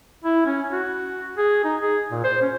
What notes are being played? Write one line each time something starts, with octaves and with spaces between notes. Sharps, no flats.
E4
C#4
F#4
G#4
D#4
G#4
A#2
C5
C#4